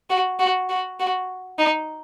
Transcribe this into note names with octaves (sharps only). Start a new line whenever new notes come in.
F#4
F#4
F#4
F#4
D#4